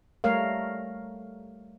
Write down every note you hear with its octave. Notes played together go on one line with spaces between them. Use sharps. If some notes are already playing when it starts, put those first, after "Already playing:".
G3 A3 A#4 C#5 F5